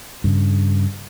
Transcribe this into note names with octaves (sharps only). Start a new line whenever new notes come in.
G2 C#3